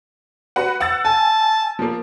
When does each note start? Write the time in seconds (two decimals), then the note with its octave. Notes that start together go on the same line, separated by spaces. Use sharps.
0.56 F#4 B4 F#5
0.80 F#5 E6 A6
1.05 G#5 A5
1.79 F3 A#3